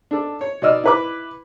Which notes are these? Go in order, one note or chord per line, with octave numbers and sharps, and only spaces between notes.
D4 A4
C#5
B2 D#4 D5 D#5 E6 F6
E4 B4 D6